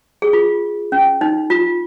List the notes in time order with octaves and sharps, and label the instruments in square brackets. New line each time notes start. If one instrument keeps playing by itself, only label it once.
[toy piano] G#4
F4
C#4
D#4
F4